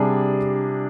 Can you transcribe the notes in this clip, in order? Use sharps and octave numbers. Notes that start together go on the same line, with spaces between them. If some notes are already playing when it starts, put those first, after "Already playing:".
Already playing: C3 G3 D4 G#4